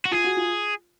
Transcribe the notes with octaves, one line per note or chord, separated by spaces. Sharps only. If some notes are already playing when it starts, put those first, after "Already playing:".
F#4
F4 G#4
F#4
F4